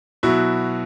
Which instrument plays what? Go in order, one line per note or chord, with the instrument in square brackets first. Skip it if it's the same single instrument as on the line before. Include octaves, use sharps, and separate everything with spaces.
[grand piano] B2 F#3 E4 F#4